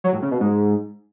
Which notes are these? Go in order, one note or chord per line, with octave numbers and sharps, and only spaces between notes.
F#3
A2
C#3
B2
G#2